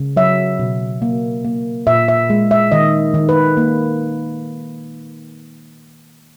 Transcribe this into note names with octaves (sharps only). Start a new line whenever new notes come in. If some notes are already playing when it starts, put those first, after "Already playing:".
Already playing: C#3
F#3 E5
B2
A#3
A#3
A#2 E5
E5
G#3
E5
D#3 D#5
D#3
B4
A#3